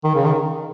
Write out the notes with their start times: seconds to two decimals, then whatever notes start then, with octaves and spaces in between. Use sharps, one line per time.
0.04 D#3
0.15 C#3
0.25 D#3